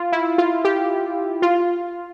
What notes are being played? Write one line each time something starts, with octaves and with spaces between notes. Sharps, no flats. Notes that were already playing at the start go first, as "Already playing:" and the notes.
Already playing: F4
E4
F4
G4
F4